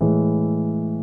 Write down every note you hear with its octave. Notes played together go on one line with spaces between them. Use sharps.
A2 E3 G#3